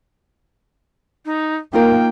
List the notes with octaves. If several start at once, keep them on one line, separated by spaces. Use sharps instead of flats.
D#4
A#3 D#4 F4 A#4 G5